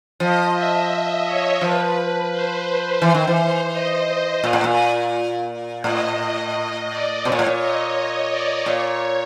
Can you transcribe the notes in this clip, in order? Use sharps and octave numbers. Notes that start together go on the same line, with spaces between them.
F3 D#5
E5
D#5
C#5
F3 B4
C5
E3 C5
D#3
E3
D#5
A#2
A2
A#2
A2 D#5
D#5
D5
B2 C#5
A#2
A2
A#2
D#5
D#5
D5
A#2 C#5